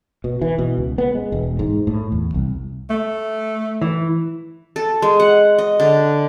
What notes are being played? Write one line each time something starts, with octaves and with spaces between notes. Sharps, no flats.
B2
E3
B2
C#2
B3
G#3
E1
G#2
A2
E2
C2
A3
E3
A4
G#3
F#5
D#5
D3